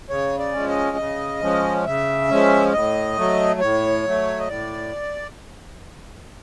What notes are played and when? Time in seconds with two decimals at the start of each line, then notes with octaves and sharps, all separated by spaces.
0.10 C#3 C#5
0.39 D5
0.53 F3 G#3 C#4
0.69 D#5
0.97 C#3
1.41 F3 G#3 C#4
1.86 C#3 E5
2.29 F3 G#3 C#4
2.73 A2 D#5
3.16 F#3 A3
3.60 A2 C#5
4.05 F#3 A3
4.39 D#5
4.48 A2 D5